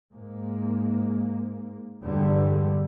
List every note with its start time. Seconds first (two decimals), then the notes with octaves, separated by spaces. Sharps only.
0.12 G#2 A#3
2.03 E2 G2 D3 G3